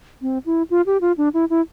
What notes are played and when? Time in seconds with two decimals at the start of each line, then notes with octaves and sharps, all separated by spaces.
0.22 C4
0.46 E4
0.70 F4
0.86 G4
1.01 F4
1.18 D4
1.34 E4
1.50 E4